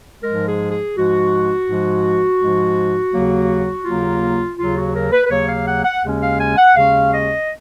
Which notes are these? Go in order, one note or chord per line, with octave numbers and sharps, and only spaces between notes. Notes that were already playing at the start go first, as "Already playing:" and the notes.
G#2 F3 G#3 A#4
G#4
G#4
G#2 F3 G#3 F#4
G#2 F3 G#3
G#2 F3 G#3
D#2 C#3 F#3 A#3
D#2 C#3 F#3 A#3 F4
D#2 C#3 F#3 A#3 F4
F#4
A#4
B4
B4
D#2 C#3 F#3 A#3 C#5
F5
F#5
F#5
D#2 C#3 G#3 C#4
F5
G#5
F#5
D#2 C#3 G#3 C#4 F5
D#5